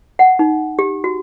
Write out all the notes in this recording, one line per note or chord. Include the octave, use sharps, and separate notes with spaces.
F#5
D#4
G4
F#4